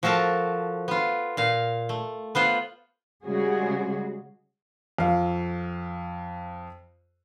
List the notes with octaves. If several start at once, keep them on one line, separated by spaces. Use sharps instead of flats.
F3 F#4 A4 A#4 A5
B3 F4
A#2 F5
A3
B3 F4 C5 F#5
C#3 G3 G#3 F#4 G#4
F2 F5